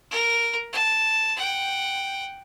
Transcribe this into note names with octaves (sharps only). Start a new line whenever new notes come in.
A#4
A5
F#5 G5